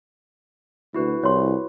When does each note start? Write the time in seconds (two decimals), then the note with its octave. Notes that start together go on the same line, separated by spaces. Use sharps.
0.94 D2 E4 F#4 B4
1.24 C2 C#5 C6